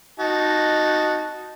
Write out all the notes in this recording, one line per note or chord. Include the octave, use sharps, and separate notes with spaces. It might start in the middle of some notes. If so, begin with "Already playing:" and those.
D#4 F#4 A5